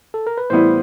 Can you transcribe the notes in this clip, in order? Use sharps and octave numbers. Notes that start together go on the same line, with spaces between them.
A4
A#4
B4
A2 E3 G3 B3 E4 C5